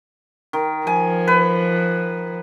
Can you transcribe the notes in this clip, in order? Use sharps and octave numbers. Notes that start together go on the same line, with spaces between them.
D#3
F3 G#5
B4